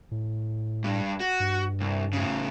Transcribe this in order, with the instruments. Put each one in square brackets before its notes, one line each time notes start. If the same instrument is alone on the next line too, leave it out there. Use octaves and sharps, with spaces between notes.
[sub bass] A2
[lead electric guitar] G2
F#4
[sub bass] G2
[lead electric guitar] C2
A2 C#3